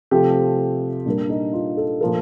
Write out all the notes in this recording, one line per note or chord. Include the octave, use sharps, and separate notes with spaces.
C3 F3 A3 G4
A#2 G3 A#3 D4
D#4
F4
A4
A#2 F3 A3 A#4